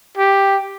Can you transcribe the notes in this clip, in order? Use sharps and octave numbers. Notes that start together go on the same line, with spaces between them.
G4